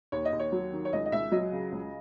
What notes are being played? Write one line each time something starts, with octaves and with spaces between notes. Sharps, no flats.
D#2 C#5
D#5
D#2
C#5
F#3
D#3
C#5
C#2 D#5
D#5
C#2 E5
F#3 D#5
C#3
C#2